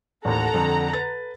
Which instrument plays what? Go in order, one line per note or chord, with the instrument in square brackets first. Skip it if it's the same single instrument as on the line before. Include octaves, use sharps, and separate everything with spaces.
[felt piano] A1 D#2 [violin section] A4 F#5 A#5
[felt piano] F2 D3
B4 A6